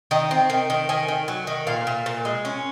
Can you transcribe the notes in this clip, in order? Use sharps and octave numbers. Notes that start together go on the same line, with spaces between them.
D#3 D#5
C4
D#3
D#3
D#3 G#5
D#3
F#3
D#3
A#2 F5
A#2
A#2
G#3
C#4